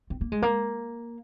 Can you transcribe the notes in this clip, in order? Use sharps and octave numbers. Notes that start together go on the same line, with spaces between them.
C4
A#3
G#3
A#3